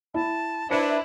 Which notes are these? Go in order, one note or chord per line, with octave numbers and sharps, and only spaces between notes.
E4 A5
D4 E4 B4 C5 C#7